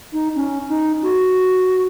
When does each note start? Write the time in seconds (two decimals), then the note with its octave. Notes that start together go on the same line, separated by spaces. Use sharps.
0.13 D#4
0.36 C#4
0.69 D#4
1.02 F#4